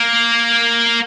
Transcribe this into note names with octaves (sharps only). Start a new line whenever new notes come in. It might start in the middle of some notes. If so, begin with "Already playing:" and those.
Already playing: A#3